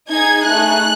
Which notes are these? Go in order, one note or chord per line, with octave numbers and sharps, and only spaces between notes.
D#4 G#4 G#6
A3 D#4 G#4 F#6